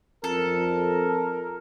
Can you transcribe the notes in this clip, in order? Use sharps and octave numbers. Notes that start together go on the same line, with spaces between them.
F2 A4 A#4